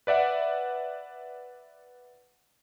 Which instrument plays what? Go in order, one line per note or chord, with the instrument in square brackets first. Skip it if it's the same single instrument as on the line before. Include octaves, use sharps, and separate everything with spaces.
[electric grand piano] B4 D5 E5 F#5